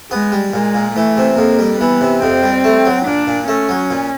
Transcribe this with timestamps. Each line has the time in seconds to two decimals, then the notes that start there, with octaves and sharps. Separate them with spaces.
0.11 G#3 B3
0.32 G3
0.54 A#2 G#3
0.74 A#2
0.96 E3 A3
1.17 C3
1.37 F2 A#3
1.59 G3
1.80 E3 B3
2.01 C3
2.22 F2 C4
2.43 G3
2.64 A3
2.85 F#3
3.06 A#2 D4
3.27 A#2
3.48 A3 C#4
3.69 F#3
3.90 A#2